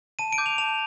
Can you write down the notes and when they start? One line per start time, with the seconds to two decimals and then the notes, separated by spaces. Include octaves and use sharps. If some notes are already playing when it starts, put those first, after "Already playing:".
0.19 A5 D#7
0.33 D7
0.38 D6 G6
0.46 F7
0.58 A5 F7